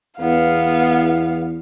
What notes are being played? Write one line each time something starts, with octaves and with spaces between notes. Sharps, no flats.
E2 B3 F5